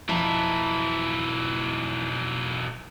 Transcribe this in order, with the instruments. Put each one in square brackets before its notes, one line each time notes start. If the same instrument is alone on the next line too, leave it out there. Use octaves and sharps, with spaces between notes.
[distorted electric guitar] B1 E3 [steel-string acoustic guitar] F2 A5 A#5 [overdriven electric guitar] E4